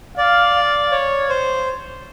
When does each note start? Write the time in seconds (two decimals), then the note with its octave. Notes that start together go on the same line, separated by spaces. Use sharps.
0.18 D5 F5
0.92 C#5
1.29 C5